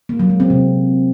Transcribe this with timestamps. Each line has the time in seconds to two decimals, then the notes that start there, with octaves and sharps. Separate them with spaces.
0.09 A#3
0.19 F#3
0.30 G#3
0.40 C4
0.50 C3